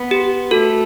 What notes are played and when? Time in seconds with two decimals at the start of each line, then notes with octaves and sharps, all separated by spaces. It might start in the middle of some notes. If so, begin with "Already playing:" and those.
Already playing: B3
0.11 G4
0.51 A3 F#4 A4